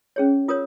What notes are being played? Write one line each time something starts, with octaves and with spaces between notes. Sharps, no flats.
C#4 G#4 C#5
F4 A#4 C#5 D#6